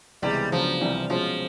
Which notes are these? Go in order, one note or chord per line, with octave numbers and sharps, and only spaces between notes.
C#2 C3 E3 G3 G#3 B3
C#3 F3 F#3 B3 D4
C2 C3 E3 G3
B2 F3 G#3 C#4 F4